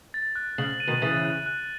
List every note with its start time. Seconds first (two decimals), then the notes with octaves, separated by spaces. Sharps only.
0.14 A6
0.35 F#6
0.58 C#3 F#7
0.80 D#7
0.87 B2 D#3
1.02 C#3 E3 A6
1.24 F#6
1.46 F#6